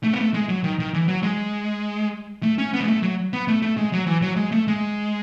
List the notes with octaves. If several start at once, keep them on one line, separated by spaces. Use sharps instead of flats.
A3
B3
A3
G#3
F#3
D#3
D#3
E3
F#3
G#3
A3
C#4
B3
G#3
A3
F#3
B3
A3
A3
G#3
F#3
E3
F#3
G#3
A3
G#3